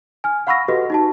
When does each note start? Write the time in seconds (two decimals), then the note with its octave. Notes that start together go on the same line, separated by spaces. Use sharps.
0.24 G#5 F6
0.47 F5 F#5 B5 C#6 E6 A#6
0.68 F#4 G4 A4 B4 D#5
0.90 D#4 F#4 A5